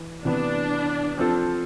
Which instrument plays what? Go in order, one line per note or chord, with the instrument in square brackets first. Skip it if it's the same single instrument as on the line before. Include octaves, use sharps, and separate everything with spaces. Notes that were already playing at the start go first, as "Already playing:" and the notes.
Already playing: [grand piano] E3
[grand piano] C3 E3 B3 [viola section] D4
[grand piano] F3 C4 F4 A4 C5